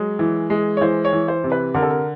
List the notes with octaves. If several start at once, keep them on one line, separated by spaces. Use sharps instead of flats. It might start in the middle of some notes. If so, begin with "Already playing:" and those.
Already playing: F#3 G#3
E3
G#3
C#5
E3 C5
C#5
E3
C5
C3
B4
D3 A#4
A4
A#4